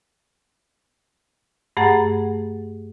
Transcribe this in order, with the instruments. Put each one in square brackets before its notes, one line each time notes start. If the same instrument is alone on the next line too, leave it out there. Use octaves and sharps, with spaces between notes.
[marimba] G2 A3 G#4 F#5 A#5 A6